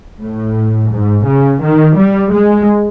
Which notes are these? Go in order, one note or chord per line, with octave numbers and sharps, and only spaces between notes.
A2
G#2
C#3
D#3
G3
G#3